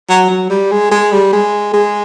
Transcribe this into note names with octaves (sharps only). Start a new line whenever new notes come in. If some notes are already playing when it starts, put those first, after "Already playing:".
F#3
F#3
G3
G#3
G#3
G3
G#3
G#3